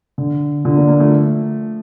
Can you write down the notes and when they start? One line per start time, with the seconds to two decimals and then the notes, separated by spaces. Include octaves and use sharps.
0.18 D3
0.65 D3 F3
0.77 A#3 D4
0.88 A#3 D4
1.00 F3 A3